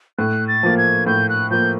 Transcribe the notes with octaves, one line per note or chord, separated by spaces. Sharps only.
A2 F#6
A6
F3 A#3
G#6
A2 G6
F#6
F3 A#3 G6